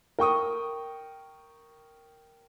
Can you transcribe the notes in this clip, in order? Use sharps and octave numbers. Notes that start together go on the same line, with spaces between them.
A#4 G5 C#6 D#6